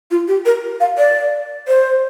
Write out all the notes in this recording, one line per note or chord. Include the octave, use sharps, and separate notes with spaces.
F4
G4
A#4
F5
D5
C5